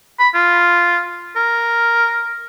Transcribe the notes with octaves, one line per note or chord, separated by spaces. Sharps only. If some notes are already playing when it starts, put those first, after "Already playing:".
B5
F4
A#4